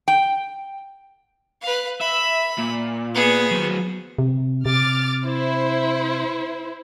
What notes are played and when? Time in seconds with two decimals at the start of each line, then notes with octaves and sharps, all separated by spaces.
0.08 G5
1.61 B4 F5
2.01 E5 B5
2.58 A#2
3.14 B3 G#4
3.51 F#3 C5
4.19 C3
4.66 C3 D6 F6 A6
5.25 E4 C5